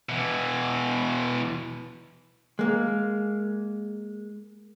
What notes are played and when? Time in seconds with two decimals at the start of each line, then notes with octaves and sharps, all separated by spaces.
0.09 B2 E3
2.59 G#3 A#3